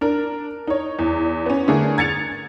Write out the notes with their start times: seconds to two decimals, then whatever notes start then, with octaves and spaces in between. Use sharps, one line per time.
0.01 D4 A#4
0.67 D#4 C#5
0.99 E2
1.46 B3 C#4
1.68 D3 A3 G#4 A#4
1.98 G#6 A6 C#7 F7